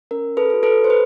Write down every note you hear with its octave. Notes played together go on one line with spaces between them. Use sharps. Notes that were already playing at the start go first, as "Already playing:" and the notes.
C#4 A#4
A4 B4
F#4 A4
A4 B4
C5
B4